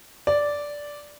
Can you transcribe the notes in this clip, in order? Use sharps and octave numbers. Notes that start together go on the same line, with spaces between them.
D5